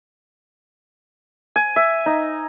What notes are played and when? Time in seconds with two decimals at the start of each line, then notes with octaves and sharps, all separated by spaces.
1.56 G#5
1.76 E5
2.06 D#4